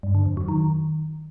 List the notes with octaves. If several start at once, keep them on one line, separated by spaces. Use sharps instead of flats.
G2
D3
F2
F#3
D#3